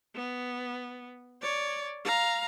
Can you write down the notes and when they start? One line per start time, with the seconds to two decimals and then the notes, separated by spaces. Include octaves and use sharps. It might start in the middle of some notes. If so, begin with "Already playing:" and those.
0.15 B3
1.42 C#5 D5
2.05 F5 A#5